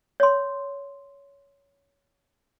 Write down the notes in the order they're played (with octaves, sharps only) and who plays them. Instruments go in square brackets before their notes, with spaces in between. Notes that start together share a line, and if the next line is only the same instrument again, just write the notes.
[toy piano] C#5 C6